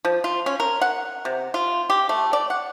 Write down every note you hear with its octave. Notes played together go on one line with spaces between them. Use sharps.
F3
F4
C#4
A#4
F#5
C3
F4
G4
A3
D5
F#5